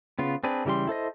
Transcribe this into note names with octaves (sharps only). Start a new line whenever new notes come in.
C#3 B3 F4
C4 D4 G#4 B4
C#3 E3 G3 G4 C6
E4 A4 C5 D#5